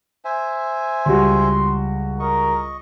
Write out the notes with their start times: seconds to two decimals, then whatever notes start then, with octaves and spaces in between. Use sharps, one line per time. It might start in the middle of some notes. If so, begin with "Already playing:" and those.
0.25 C5 E5 G#5
1.06 C#2 G3 F#4 C6
2.20 A#4 D#5 C#6